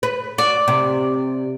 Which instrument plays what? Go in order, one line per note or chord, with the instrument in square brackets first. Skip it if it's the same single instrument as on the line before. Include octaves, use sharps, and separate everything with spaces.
[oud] B4
[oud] F#4 [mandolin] D5
[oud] C3